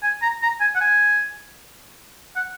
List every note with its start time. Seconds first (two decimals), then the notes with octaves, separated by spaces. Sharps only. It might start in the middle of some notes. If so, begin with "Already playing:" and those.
0.03 G#5
0.22 A#5
0.43 A#5
0.61 G#5
0.76 F#5
0.81 G#5
2.36 F#5